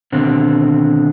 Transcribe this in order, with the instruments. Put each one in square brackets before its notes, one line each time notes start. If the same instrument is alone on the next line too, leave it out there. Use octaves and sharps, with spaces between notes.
[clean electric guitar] D#2 B2 D3 C4